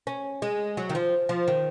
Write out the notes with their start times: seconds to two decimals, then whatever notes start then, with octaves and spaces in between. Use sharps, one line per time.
0.07 C#4
0.42 G#3
0.77 F#3
0.90 D#3
0.95 F3
1.29 F3
1.48 D#3